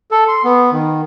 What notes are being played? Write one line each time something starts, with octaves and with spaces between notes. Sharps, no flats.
A4
C6
B3
D#3